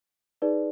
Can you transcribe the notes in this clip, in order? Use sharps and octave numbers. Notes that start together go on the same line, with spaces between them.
D#4 G#4 B4 D5